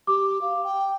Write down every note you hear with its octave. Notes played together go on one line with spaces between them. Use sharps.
G4 D6
F5
G5